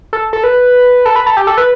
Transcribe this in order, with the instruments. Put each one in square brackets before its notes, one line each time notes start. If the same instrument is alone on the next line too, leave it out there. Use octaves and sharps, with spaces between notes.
[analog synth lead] A4
A4
B4
A4
B4
A4
G4
A4
B4